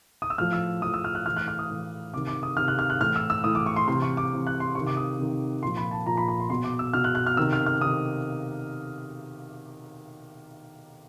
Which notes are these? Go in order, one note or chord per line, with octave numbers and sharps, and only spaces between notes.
D#6
E6
A2 F3 F6
E6
A2 F3 D#6
E6
F6
F#6
A2 E3 F6
F#6
F6
D#6
A2 E3
C3 D#3 D6
D6
D#6
C3 D#3 F6
F#6
F6
F#6
A2 E3 F6
E6
E6
A2 E3 D#6
D6
C#6
C6
C3 E3 C6
C#6
D6
C3 E3
F#6
C6
C3 C#6
D#3
D6
D#6
C3 D#3
A#2 F3 C6
B5
A5
A#2 F3 A#5
B5
B5
C6
B2 C6
D6
E6
B2 F6
F#6
F#6
F6
C3 D#3 E6
F6
F6
C3 D#3 D#6